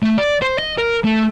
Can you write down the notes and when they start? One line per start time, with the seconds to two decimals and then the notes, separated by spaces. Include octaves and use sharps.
0.02 A3
0.18 D5
0.42 C5
0.59 D#5
0.78 A#4
1.04 A3